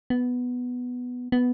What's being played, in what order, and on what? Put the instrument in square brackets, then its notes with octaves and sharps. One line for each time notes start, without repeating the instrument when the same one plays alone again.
[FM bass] B3
B3